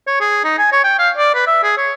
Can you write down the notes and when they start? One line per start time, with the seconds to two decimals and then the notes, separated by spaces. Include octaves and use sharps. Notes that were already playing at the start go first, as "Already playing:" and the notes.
0.07 C#5
0.21 G#4
0.45 D#4
0.59 G#5
0.72 C#5
0.84 G5
0.99 F5
1.17 D5
1.34 B4
1.47 E5
1.63 G#4
1.77 C#5